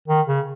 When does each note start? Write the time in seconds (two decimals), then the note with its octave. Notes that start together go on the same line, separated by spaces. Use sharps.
0.08 D#3
0.27 C#3